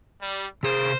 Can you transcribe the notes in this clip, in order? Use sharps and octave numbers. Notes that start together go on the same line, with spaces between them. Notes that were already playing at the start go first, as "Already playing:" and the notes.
G3
C3 G#4 A#4 C5